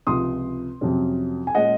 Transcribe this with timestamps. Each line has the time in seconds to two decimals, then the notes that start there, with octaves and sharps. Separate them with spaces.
0.07 C#2 C3 F3 C6 D#6
0.81 F2 C3 F#3 C#4
1.47 G#5
1.55 A#2 G#3 C#4 D#5 F#5